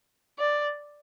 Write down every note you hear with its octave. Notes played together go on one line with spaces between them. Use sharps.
D5